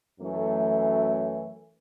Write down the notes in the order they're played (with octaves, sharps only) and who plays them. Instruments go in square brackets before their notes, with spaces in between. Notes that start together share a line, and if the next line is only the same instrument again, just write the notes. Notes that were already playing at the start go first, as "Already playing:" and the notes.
[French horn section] F#2 E3 A3